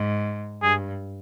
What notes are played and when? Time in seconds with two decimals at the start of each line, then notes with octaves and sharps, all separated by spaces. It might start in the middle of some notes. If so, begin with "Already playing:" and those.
Already playing: G#2
0.62 G2 G#4